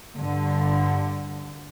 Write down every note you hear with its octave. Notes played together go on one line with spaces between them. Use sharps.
G2 D3